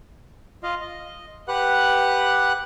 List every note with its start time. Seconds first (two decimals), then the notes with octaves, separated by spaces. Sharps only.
0.63 F4 D#5 F5
0.82 D#5
1.48 G4 B4 F#5 F#6